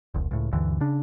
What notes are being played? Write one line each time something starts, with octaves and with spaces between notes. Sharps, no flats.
E1 C2
C#2 A2
D2 G2 D3 E3
C#3 D4